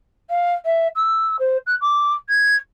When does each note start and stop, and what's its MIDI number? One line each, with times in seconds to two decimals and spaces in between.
0.30 0.53 77
0.65 0.87 76
0.95 1.36 88
1.39 1.57 72
1.66 1.75 90
1.81 2.13 86
2.29 2.55 92